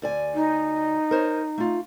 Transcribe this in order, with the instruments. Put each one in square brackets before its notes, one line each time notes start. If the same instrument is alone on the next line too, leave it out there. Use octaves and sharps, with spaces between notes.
[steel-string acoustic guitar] D2 D5 G#5
[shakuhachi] D#4
[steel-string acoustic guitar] A#4 C5 C#5
A3 F4